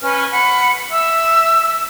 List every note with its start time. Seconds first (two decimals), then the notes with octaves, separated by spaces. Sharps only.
0.02 C#4 B4 F6
0.31 F#5 B5
0.91 E5 E6